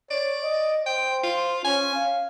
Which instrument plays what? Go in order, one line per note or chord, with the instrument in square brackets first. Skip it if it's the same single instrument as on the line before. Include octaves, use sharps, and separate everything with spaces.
[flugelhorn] C#5 [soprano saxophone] D5
[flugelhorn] D#5
[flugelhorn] C5 [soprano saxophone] G5
[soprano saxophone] F4
[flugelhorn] C#4 [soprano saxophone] G#5
[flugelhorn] F5